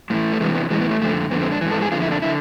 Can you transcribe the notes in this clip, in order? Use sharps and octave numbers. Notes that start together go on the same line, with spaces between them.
A2 E3 G#3
A3
E2 C3 E3 G#3
B3
A2 E3 G#3
B3
A3
F2 D3 A3
F2 D3 B3
C4
D4
G#2 E3
A4
G#4
F2 D3 F4
E4
D4
D3 E4